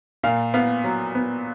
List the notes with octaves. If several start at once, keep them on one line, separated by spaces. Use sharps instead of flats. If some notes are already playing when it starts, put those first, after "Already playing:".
A#2 F5
B3 F5
F#3
B3